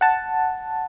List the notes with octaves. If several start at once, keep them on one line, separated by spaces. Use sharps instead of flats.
F#5 A5